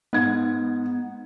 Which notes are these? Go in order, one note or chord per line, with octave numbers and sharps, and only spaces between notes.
G#2 B3 G#6